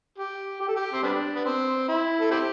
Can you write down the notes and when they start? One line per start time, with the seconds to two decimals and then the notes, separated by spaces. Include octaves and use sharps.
0.18 G4
0.61 G4
0.68 A4
0.76 G4
0.93 C4
1.03 G3 B3 D4
1.35 B3
1.45 C4
1.88 E4
2.20 A4
2.31 C4 E4 G4